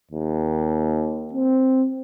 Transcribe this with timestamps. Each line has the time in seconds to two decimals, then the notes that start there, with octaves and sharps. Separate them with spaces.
0.11 D#2
1.33 C4